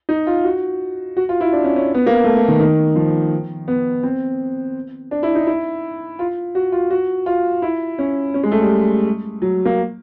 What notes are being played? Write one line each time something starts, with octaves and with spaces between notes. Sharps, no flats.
D#4
F4
F#4
F#4
F4
E4
D4
C#4
C#4
B3
A#3
A3
A3
D#3
D#3
F3
B3
C4
D4
E4
D#4
E4
F4
F#4
F4
F#4
F4
E4
C#4
C#4
G#3
A3
G3
F#3
A#3